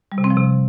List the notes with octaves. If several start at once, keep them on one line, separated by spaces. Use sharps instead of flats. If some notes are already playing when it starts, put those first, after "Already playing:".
G3
C3
C4
F3
C3